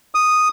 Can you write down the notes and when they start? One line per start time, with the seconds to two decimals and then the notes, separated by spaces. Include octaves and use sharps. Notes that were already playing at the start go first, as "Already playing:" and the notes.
0.15 D#6